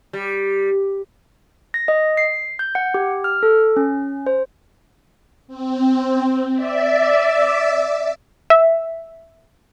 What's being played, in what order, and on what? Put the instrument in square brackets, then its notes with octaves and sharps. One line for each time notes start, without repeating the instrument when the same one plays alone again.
[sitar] G3
[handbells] A#6
D#5
C7
G6
F#5
G4
F6
A4
C#4
C5
[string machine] C4
D5 E5
[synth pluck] E5